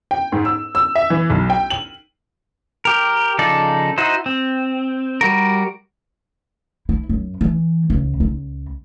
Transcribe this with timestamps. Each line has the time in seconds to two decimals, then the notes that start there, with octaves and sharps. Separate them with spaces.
0.11 G5
0.32 G#2
0.45 E6
0.75 E6
0.95 E5
1.10 E3
1.30 B1
1.50 G5
1.70 F#7
2.85 G4 A#4
3.39 C#3 F3 D#4 A4 D5
3.98 D#4 E4 F#4 C5
4.26 C4
5.21 G3 F#4 A#4
6.89 E4
7.09 F#2
7.41 E3
7.90 C#2
8.20 C#2